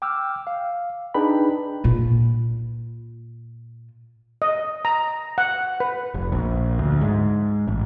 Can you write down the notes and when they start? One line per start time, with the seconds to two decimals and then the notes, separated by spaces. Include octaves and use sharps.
0.02 G5 D6 E6 F6
0.47 F5
1.14 D4 D#4 G#4 B4 G5 B5
1.84 A#2 F4
4.42 D#5
4.85 A#5
5.38 F#5
5.80 B4
6.14 F1
6.32 A#1
6.79 D2
7.01 G#2
7.67 A1